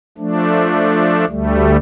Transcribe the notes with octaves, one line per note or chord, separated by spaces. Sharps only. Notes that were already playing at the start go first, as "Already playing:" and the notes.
F3 A3 D4
D2 G3 A3